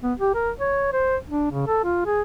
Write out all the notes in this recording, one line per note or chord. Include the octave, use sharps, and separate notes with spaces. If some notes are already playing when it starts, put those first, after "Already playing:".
B3
G4
A#4
C#5
C5
D4
C#3
A4
F4
G#4